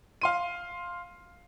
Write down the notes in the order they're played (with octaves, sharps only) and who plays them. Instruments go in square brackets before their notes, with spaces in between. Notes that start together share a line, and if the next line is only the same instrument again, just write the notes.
[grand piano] F5 C6 D#7